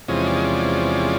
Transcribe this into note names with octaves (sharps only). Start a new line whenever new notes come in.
E2 C3 F3 G#3 C#4 D#5
D5
D#5
D5